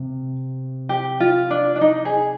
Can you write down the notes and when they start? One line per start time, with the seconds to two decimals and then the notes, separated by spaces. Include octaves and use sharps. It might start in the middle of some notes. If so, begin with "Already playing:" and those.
Already playing: C3
0.89 G4
1.20 F4
1.50 D4
1.76 D4
1.81 D#4
2.05 G#4